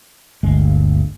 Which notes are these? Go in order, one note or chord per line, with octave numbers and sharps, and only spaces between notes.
G1 D2 G#3